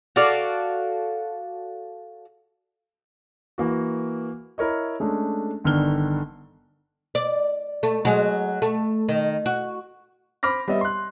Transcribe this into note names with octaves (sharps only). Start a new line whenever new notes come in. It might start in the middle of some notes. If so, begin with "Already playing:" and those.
F#4 A4 D5 F5
E3 A#3 F#4
E4 A#4 C#5 D#5
G#3 A3 C#4 D4
G1 D3 D#3 F6 G7
D5
A3
F#3 G#3
A3
D#3
F#4
C5 B5 D6 F6 A#6
G3 B3 C#5 D#5 E5
C6 F#6